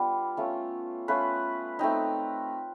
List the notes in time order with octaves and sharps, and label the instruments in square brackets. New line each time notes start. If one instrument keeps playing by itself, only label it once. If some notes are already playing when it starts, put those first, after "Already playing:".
Already playing: [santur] G3 B3 D4 F4
A3 C#4 F4
A3 C#4 F4 B4
A3 C4 D#4